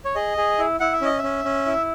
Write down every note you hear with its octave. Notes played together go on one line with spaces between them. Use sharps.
C#5
G#4 D#5
G#4
E4
E4 F#5
E5
C#4 D#5
E5
C#4
C#4
E4